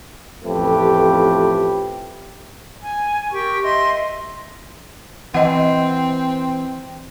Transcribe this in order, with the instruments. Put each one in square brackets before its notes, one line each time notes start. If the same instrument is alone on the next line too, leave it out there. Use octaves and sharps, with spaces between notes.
[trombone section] A1 F2 A3 G4 B4
[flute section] G#5
G4 A#4 G5 C#6
D#5 E5 C6
[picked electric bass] E3 [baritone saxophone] C4 [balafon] D#5 F#5